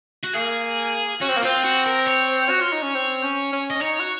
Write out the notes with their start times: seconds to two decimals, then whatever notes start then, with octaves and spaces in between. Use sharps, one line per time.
0.23 F#4
0.34 A#3 G#4
1.21 C#4 F#4
1.29 C4
1.37 A#3
1.43 C4 F4
1.64 F#4
1.86 A#4
2.07 C#5
2.49 F#4
2.61 F4
2.72 D#4
2.82 C#4
2.94 C4
3.23 C#4
3.52 C#4
3.70 C#4 D#5
3.81 D#4 C#5
3.99 F#4